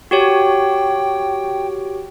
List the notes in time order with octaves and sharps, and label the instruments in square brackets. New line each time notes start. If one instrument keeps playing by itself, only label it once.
[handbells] F#4 G4 C#5 [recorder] G5